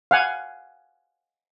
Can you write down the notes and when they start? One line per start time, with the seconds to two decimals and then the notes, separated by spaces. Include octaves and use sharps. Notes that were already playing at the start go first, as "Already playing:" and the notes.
0.11 F5 F#5 G#5